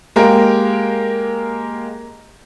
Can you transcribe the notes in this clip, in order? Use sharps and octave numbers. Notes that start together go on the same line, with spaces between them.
G#3 A#3 G4 A#4